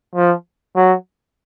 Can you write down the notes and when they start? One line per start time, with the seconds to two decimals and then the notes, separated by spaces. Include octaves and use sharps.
0.15 F3
0.76 F#3